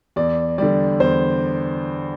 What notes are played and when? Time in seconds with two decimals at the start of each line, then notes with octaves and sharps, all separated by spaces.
0.16 E2 D5
0.58 D3 G3 D5
1.00 E2 C5